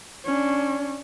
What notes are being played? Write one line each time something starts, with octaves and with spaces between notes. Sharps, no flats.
C#4 D4